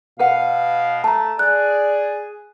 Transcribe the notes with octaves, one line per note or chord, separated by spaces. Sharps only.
B2 B4 F5 F#5
A3 A5 A#5
G#4 D5 F#6